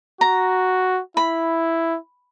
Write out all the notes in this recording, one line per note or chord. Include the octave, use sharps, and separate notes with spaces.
F#4 A#5
E4 B5